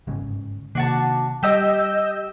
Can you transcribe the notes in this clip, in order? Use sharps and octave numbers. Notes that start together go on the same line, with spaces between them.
G1 G#2 C#3
C3 D#3 A#3 D4 F#4 A5
G3 G4 D#5 E6 G6